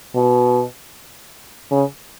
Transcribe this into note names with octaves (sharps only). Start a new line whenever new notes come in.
B2
C#3